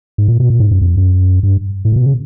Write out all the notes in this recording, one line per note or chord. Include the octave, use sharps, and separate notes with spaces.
G#2
A#2
B2
A#2
G#2
F#2
F2
F#2
G2
A2
A#2
B2
C#3